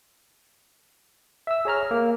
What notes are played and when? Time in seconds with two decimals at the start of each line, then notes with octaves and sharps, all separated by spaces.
1.47 E5 E6
1.65 G#4 C#5 A#5 F6
1.91 A#3